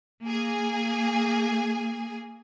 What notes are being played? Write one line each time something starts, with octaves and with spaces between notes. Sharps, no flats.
A#3 G#4 G#5